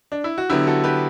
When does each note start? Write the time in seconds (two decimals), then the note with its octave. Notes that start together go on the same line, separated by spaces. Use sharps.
0.12 D4
0.24 E4
0.38 F#4
0.49 D3 F#3 B3 E4 G4
0.67 F#4 A4
0.84 G4 B4